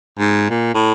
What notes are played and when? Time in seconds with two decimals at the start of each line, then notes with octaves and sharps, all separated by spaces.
0.19 G#2
0.50 A#2
0.74 A2